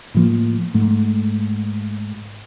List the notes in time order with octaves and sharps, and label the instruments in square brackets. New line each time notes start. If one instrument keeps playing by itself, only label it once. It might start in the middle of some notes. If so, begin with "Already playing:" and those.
[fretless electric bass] A2 F3 A#3
G#2 A3